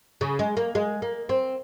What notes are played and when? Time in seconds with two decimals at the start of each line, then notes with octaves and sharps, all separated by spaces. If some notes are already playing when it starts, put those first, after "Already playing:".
0.21 C#3
0.39 G#3
0.57 A#3
0.75 G#3
1.02 A#3
1.29 C4